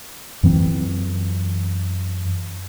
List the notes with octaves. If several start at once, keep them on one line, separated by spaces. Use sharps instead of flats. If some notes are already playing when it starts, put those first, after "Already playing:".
F#2 E3 C4